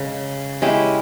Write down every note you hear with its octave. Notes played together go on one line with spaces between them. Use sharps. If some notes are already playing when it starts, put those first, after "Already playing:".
Already playing: C#3 G#3
G#3 C#4 E4 G4